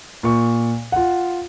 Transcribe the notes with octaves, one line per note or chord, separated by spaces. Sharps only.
A#2 C#6
F4 F#5